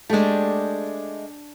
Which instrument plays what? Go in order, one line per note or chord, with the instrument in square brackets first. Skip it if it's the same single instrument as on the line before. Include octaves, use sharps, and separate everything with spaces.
[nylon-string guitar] G#3 A3 [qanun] D4 G4